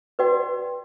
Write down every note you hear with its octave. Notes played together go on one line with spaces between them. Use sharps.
F#4 B4 D5 G5